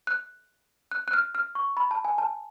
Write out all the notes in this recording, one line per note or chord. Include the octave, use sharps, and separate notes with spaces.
F#6
F#6
F#6
F6
F6
C#6
B5
A5
G#5
A5